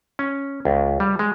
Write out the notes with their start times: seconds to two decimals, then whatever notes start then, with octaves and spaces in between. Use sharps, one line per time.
0.19 C#4
0.65 C#2
1.00 G3
1.19 G#3